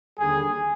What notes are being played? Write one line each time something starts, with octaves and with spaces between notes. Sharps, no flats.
D#2 D3 G3 G#4